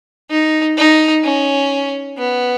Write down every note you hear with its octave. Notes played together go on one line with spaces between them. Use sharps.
D#4
D#4
C#4
B3